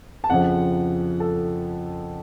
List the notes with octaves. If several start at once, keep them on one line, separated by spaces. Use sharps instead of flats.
A5
F2 C#3 F3 F#5
A4